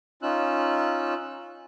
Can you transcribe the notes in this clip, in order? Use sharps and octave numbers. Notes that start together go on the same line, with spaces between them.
C#4 D#4 F4 E6 F#6